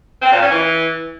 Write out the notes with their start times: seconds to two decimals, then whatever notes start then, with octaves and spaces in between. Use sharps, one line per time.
0.22 C4
0.32 A#2
0.41 C#4
0.51 E3